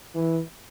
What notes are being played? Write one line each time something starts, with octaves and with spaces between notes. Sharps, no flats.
E3